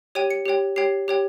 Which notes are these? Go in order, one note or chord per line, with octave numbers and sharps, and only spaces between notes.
G4 C#5 G5 D#7
C#7
G4 C#5 G5
G4 C#5 G5 C7
G4 C#5 G5